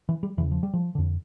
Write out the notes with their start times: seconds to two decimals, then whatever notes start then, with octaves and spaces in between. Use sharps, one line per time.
0.09 E3
0.23 G3
0.37 E2 C#3 E3
0.51 F3
0.63 G3
0.74 F3
0.95 F2 D3